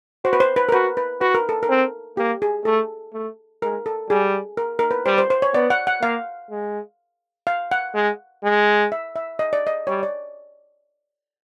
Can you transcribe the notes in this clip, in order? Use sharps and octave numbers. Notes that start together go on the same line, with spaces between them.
F#4 C5
B4
C5
B4
A#4
F#4 B4
B4
F#4 B4
A#4
A4
A#4
C4
A#3 G4
G#4
A3 A4
A3
G#3 A#4
A4
G3 G#4
A#4
A#4
B4
G3 C5
C5
C5
C#5
B3 D5
F#5
F#5
A#3 F5
G#3
F5
F#5
G#3
G#3
E5
E5
D#5
D5
D#5
G3 C#5
D5